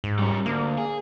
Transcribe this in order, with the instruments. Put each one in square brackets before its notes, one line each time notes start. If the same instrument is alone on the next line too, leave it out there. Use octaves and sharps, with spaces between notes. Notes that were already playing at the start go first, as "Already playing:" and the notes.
[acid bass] G#2
[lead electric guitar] G3 C#4
[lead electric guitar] D2 [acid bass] A#3
[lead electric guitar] G#4